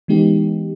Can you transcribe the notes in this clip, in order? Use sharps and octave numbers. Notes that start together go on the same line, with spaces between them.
E3 G#3 B3 D#4 G4